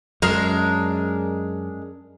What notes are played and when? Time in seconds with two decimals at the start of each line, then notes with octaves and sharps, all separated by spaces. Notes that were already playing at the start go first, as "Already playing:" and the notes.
0.22 F#2 G#3 D4 A#4